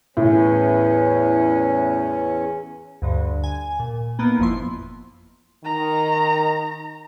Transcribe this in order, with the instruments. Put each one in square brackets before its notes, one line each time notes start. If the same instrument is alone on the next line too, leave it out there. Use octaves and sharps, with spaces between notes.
[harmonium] E2 C#4 [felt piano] A2
[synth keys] D2 G2 D3
G#5
A#2
A#3 B3 D#4
G1 F2 F3 E4 C6
[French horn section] D#3 [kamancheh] A#5